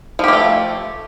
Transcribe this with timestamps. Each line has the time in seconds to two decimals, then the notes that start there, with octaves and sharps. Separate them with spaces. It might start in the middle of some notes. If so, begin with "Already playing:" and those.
0.19 F3
0.24 G4
0.28 A#3
0.33 A3